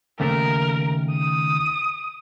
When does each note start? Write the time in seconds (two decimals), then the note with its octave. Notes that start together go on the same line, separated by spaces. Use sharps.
0.20 D#2 C#3 A3 A#4
1.12 D#6